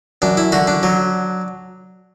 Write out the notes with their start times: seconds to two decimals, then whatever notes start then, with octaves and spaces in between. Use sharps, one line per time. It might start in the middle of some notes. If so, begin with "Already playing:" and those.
0.22 F#2 D4
0.37 E4
0.52 D3 F#4
0.67 D4
0.83 F#3